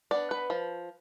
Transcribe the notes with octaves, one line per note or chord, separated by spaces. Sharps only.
B3 D4 D5
B4
F3